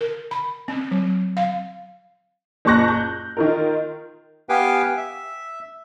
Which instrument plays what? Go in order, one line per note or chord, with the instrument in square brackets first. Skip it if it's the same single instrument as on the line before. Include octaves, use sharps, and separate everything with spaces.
[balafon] A#4
B5
C4
F#3
F5
[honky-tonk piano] F#1 A#2 A5 C#6 F#6 A#6
G6
D#3 F4 A#4
[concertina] B3 G4 B4 F5 G5 G#5
E5